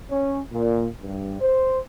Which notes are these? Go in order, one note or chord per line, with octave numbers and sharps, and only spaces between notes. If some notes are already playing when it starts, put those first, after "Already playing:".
C#4
A#2
G2
C5